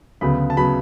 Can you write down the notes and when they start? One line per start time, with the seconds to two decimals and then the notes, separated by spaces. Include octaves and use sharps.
0.21 D2 C#3 F#3 B3 B5
0.50 A5
0.57 C#3 F#3 B3 B5